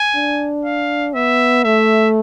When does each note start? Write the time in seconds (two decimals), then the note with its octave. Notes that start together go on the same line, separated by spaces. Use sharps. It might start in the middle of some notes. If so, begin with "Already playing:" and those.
Already playing: G#5
0.16 D4
0.65 F5
1.15 B3 E5
1.65 A3 E5